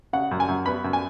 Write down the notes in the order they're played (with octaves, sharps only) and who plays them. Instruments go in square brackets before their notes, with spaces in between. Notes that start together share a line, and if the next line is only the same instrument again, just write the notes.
[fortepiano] C#3 F#5
F#2
G#5
F#2
B3 B5
F#2
G#5